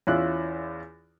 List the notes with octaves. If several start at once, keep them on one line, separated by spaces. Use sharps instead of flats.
E2 C#4 E4 F4 F#6